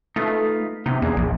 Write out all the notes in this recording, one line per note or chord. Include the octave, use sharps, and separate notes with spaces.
A3 D#4 F4 B4
C3 B3 D#4
E2 A#3 D4 G#4
A#1 F3